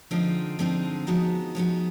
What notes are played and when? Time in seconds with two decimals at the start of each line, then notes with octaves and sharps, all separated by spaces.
0.11 D3 F3 G#3 C4 D#4
0.59 D3 F3 G#3 C4 D#4
1.07 F3 G#3 B3 D#4 F#4
1.55 F3 G#3 B3 D#4 F#4